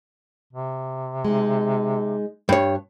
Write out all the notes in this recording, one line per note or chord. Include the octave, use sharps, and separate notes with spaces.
C3
G#3 D#4
G2 C#5